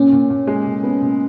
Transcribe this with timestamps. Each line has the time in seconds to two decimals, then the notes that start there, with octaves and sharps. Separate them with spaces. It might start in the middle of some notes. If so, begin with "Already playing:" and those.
Already playing: A#2 C#4
0.12 A#2
0.30 A#2
0.47 G#3
0.66 A#2
0.84 B3
1.02 A#2